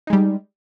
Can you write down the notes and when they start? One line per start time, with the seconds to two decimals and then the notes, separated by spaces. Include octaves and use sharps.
0.07 D#4
0.10 G#3
0.13 G3